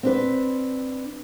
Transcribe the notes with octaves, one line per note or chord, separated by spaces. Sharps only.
C4 D4 B4